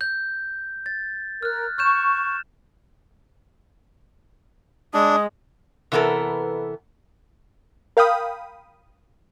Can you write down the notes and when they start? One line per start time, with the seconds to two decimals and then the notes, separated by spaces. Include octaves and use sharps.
0.01 G6
0.86 A6
1.43 A#4 F6 F#6
1.78 C#6 F6 G6 E7
4.94 G#3 D4 D#6
5.92 C3 E3 B3 A4 A#4
7.97 A#4 F5 G5 B5 D#6